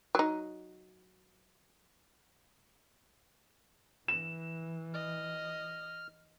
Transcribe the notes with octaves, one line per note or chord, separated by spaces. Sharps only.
F#3 D#4
E3 E7
D#5 F6